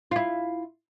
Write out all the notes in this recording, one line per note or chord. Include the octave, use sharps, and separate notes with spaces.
E4 F4